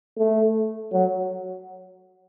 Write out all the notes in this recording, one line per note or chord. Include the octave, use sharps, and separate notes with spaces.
A3
F#3